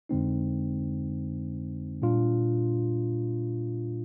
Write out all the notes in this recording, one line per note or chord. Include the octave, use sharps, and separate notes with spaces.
F2 D3 G#3 C4 D#4
A#2 G3 D4 F4